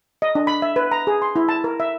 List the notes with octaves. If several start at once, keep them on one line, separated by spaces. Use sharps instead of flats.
D#5
D4
B5
E5
B4
A#5
G#4
C6
E4
A5
A#4
E5